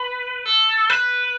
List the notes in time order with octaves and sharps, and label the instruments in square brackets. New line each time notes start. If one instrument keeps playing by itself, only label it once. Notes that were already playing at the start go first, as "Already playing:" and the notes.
Already playing: [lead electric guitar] B4
A4
B4